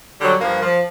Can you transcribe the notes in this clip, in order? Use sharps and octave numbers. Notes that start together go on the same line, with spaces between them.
D3 F#3 G3
G2 F3 A#3
F3